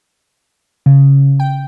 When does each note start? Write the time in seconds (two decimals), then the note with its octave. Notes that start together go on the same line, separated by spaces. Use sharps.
0.86 C#3
1.40 G5